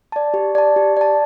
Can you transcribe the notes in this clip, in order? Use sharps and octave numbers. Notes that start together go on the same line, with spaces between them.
D5 A5
G4
D5 A5
G4
D5 A5